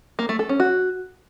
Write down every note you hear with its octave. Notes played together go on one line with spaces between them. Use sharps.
A#3
A3
A4
C#4
F#4